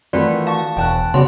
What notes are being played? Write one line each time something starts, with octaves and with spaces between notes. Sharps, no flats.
D#3 E3 A3 C4 F4 F#4 B4 D5
F5 A5 C#6
E1 E2 G5 A5 F#6
C#3 B3 F#4 D5 C6